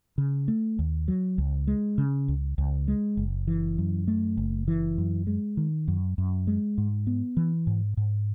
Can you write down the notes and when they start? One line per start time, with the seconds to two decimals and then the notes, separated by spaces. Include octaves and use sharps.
0.18 C#3
0.48 A3
0.79 D#2
1.08 F#3
1.38 C#2
1.67 G#3
1.98 C#3
2.28 C#2
2.58 C#2
2.88 G#3
3.17 F#1
3.48 E3
3.78 F#2
4.08 A3
4.37 F#1
4.68 E3
4.98 F#2
5.27 G#3
5.57 D#3
5.88 F#2
6.18 F#2
6.47 G#3
6.78 G#2
7.07 B3
7.37 E3
7.67 G#2
7.97 G#2